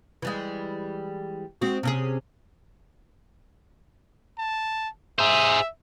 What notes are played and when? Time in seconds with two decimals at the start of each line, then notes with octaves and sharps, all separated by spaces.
0.22 E3 G3 G#3
1.62 G#3 C4 F#4
1.83 C3 C#4 G#4
4.38 A5
5.19 G#4 C5 E5